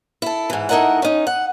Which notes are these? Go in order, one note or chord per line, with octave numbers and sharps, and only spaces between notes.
E4 A4
G#2 E3
A3 D#4 E4 A#4 D#5 F#5
C#4 D#4
F#5